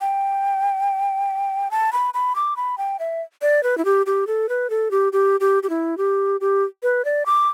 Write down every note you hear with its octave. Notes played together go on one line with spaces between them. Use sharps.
G5
A5
B5
B5
D6
B5
G5
E5
D5
B4
E4
G4
G4
A4
B4
A4
G4
G4
G4
G4
E4
G4
G4
B4
D5
D6